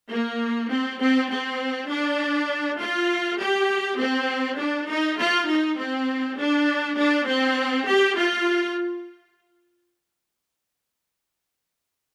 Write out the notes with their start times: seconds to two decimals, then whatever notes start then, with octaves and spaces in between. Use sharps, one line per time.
0.10 A#3
0.70 C4
1.00 C4
1.30 C4
1.90 D4
2.79 F4
3.39 G4
3.98 C4
4.57 D4
4.88 D#4
5.18 F4
5.47 D#4
5.77 C4
6.38 D4
6.96 D4
7.26 C4
7.86 G4
8.16 F4